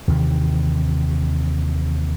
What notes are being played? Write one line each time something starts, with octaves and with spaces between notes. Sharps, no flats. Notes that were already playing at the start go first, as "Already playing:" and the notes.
D#2 C3 D#3 E3